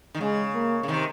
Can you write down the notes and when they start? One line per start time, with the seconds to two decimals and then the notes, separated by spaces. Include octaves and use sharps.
0.14 D#3
0.20 C#3 G#3
0.55 A#3
0.83 C#3
0.88 C3 D#3